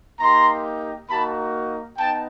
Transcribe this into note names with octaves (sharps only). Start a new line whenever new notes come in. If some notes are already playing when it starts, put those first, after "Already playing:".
A#3 D#4 G4 A#5 C6
A#3 D#4 F#4 A5 B5
B3 D#4 G5 A5